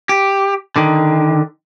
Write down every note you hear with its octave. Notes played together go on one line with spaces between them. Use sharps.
G4
D3 D#3